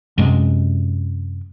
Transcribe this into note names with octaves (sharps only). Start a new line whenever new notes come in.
F#2 C3 G#3